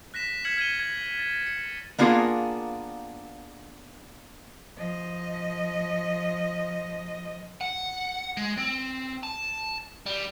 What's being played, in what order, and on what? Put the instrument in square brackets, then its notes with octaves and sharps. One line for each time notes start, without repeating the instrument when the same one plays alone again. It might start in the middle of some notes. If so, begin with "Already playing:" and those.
[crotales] F#6 A#6 B6 E7
F6 G#6 B6 C#7 E7 F#7
F6 G#6 C#7 D#7 G7
G#6
A6
C#7
[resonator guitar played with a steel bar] A#3 B3 D4 F4 G#4 A#4
[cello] F3 D#5
[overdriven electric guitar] F#5
G#3
C4
A5
G3